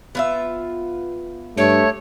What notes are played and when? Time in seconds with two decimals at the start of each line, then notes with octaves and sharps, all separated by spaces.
0.15 B3 F4 E5
1.57 G2 A3 G4 C#5